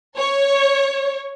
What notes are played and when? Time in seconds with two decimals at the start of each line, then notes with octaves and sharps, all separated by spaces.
0.17 C#5